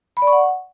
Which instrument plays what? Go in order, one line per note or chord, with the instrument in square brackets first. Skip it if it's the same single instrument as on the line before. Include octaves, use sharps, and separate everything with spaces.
[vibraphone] B5
D5
C#6
F#5